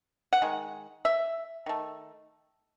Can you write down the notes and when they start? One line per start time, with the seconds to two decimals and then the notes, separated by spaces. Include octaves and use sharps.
0.33 F#5
0.42 D#3 G#3
1.05 E5
1.66 D#3 A3